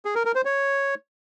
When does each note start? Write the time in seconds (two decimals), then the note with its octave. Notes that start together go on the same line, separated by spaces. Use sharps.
0.05 G#4
0.15 A#4
0.25 A#4
0.35 C5
0.45 C#5